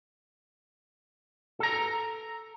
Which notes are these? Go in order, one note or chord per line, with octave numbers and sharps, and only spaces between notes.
A4 A#5